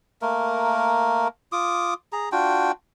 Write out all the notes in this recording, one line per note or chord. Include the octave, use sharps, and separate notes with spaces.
A3 A#3 A#4
F4 D6 D#6
G#4 A#5
D4 F4 F#4 G5